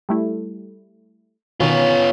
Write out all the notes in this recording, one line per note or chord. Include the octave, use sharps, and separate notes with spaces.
G3 A3 E4
B2 D#3 B3 C#4 F4